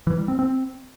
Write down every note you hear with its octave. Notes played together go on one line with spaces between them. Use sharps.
E3
G3
C4
C4